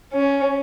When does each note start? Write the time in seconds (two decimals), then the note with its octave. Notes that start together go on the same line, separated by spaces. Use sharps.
0.13 C#4